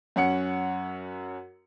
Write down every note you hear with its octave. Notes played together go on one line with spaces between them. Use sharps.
F#2 C#4 F#5 C#7